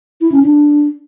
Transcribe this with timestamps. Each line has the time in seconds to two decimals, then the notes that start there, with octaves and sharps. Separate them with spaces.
0.21 E4
0.32 C#4
0.43 D4